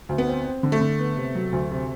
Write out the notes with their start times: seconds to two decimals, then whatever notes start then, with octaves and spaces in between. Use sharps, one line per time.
0.09 D2
0.18 B3
0.27 C4
0.45 C4
0.63 D3
0.72 A3
0.81 D3
0.99 B3
1.17 C3
1.35 F#3
1.52 D2
1.71 C3